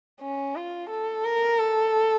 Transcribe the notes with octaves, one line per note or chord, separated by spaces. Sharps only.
C#4
F4
A4
A#4
A4